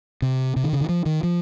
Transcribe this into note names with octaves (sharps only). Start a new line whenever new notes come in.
C3
C3
D#3
C#3
D#3
F3
D#3
F3